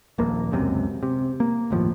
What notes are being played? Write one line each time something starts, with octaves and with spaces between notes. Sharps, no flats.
D#1 A#1 A#3
E1 C#2 F#2 C3
C3
A#3
G1 D#2 A2 F3